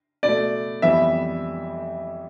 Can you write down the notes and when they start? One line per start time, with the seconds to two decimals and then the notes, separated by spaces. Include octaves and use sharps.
0.23 B2 A3 D5
0.82 F2 E3 G3 B3 E5